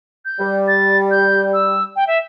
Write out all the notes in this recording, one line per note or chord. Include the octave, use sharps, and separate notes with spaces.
G6
G3
A6
G6
E6
G5
E5